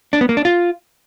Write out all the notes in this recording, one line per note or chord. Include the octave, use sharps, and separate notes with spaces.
D4
B3
A#3
D4
F4